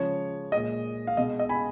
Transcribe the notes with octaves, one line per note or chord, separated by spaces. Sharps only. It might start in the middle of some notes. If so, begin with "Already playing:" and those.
Already playing: C#3 F3 G#3 C#5
A#2 G#3 D#5
F5
B2 G#3 D#5
D#5
G#5 B5